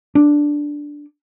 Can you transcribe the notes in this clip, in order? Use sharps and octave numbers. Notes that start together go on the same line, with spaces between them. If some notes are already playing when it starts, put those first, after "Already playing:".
D4